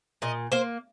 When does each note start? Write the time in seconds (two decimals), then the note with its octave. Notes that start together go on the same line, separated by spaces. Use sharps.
0.22 A#2 D#5
0.52 A#3 C5